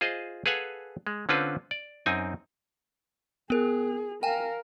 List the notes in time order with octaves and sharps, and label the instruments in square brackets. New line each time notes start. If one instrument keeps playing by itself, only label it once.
[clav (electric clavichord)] F4 G#4 C5 D#5
G#4 A4 B4 F5 F#5 G#5
G#3
D3 C4 C#4 F4 B4 C5
D5
F#2 C4 D#4 G#5
[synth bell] B3 A#4 [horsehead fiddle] G#4
[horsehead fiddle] A#4 F5 [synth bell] G5 G#5